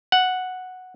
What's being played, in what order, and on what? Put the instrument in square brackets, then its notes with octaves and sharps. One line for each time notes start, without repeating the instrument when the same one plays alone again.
[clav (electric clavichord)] F#5